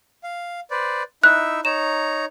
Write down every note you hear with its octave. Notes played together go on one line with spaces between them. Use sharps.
F5
B4 C5 D5
D#4 E4 E5 F#6
D#4 C#5 A#5 E7